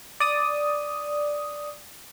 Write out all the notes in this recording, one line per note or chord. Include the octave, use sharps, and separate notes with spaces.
D5 D#6